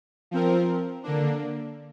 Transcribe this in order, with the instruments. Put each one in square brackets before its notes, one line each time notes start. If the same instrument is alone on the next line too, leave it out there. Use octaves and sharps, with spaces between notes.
[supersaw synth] F3 C4 A#4
D3 A#3 D4